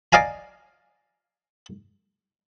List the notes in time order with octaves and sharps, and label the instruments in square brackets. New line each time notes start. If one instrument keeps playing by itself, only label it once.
[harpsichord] D5 D#5 F5 G#5 A#5